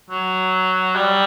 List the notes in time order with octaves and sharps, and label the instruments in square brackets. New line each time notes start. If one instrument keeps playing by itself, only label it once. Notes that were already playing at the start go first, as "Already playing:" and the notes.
[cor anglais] F#3
G3